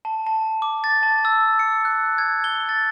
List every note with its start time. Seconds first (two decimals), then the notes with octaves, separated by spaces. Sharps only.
0.05 A5
0.27 A5
0.62 D6
0.84 A6
1.03 A5
1.25 E6
1.59 C#7
1.85 F#6
2.18 G#6
2.44 G7
2.69 A6